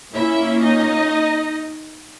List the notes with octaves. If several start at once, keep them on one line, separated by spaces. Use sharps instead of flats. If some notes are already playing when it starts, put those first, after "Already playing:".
A#2 A#3 C#4 E4 E5
D#4 D#5